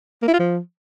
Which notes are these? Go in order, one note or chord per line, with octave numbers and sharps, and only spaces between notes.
A#3
E4
F4
F3